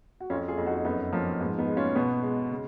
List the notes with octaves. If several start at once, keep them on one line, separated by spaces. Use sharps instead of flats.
F#4
F2 C#4 F4
F4 G#4
F2
D#4 F#4
F#2 B3 D#4
F3 A#3 C#4
G#2 B3
B3 D#4
G#3
C#4 F4
B2 B3
G#3
C#3